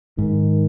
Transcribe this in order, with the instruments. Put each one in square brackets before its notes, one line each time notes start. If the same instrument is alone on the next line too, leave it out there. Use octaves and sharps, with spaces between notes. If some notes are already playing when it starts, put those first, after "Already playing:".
[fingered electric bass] G#2 [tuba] D#3